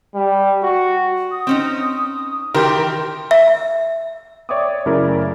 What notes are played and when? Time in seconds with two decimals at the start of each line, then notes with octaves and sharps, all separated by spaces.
0.15 G3
0.63 F#4
1.31 D#6
1.47 C4 C#4 D#4
2.54 D#3 E3 G4 A#4 C6
3.31 E5
4.49 C#5 D5 E5 G5 D6 D#6
4.86 F#2 C#3 A3 E4 A#4 D5